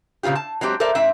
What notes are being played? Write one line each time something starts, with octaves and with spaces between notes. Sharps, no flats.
A#2 C#3 C4 F4 G4
A5
F#3 G#3 C4 G4
A4 A#4 C5 D5 E5
G#2 C4 E5